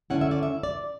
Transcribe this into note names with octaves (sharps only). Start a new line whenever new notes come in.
D3 A3 C#4 E4 F#5
E5
D5
E5
D5